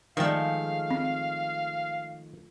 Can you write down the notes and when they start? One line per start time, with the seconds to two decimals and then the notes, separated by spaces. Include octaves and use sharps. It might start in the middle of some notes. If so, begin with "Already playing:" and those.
0.17 D#3 F3 G#3 A3 F5 G5
0.91 C4